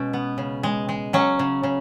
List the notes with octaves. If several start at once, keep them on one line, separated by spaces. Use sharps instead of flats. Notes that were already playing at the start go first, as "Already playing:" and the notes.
Already playing: B2 G#3 C#4
B3
C#3
G#3
G#3
F#3 C#4
C#3
C#3